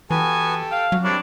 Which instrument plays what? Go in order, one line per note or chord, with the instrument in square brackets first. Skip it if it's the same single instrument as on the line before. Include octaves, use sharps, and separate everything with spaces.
[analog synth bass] E3 [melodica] B3 F#4 B4 [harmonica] G4 A4 [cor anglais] G#5
[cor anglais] F5 [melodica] G5
[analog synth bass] F#3 [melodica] C#4 F#4
[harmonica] G3 C4 C#5 [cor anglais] D4 [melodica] E4 A#4